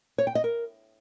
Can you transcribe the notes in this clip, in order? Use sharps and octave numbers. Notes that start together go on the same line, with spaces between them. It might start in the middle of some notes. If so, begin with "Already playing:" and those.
C#5
G5
D#5
A#4